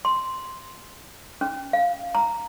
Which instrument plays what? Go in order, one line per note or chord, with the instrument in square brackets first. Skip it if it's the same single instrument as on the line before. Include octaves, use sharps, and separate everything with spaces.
[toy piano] C6
C#4
F5
A#5